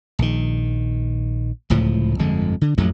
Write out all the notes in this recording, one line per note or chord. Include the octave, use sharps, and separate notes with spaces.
A#1 D#3
D1 C#2 A2 F3
G1 F2 D3 G#3
D3
A1 F2 F#3 A3